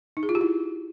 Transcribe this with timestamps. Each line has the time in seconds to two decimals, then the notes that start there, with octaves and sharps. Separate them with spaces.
0.17 D#4
0.23 G#4
0.29 F4
0.35 G4
0.41 E4